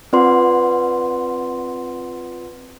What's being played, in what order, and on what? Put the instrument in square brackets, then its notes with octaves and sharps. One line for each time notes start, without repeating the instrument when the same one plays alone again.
[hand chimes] C4 F4 B4 D5 F#5 C6